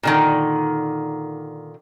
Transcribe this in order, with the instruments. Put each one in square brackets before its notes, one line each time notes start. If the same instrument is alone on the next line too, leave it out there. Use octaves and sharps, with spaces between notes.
[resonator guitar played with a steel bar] A#2 D3 D#3